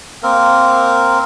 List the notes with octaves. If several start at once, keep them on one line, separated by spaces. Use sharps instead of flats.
A#3 C4 A#4